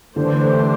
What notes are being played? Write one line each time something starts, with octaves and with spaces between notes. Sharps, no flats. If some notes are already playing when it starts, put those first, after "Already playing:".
D3 E3 A3 D4 G4 C5